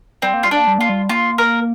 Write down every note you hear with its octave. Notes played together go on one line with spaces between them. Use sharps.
G3 C4
A#3
G3 F4
D4
A#3
G3
A#3 F4
G3
A#3 F4
A#4